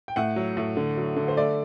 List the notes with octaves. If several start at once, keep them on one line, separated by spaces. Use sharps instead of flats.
G5
A2 F#5
F#3
A2
D3
F#3
D3
C5
A3 D5